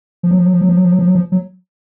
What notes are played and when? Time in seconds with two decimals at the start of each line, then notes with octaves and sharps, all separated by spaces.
0.23 F3
0.31 F#3
0.38 F3
0.46 F#3
0.53 F3
0.61 F#3
0.69 F3
0.77 F#3
0.85 F3
0.92 F#3
0.99 F3
1.07 F#3
1.15 F3
1.32 F#3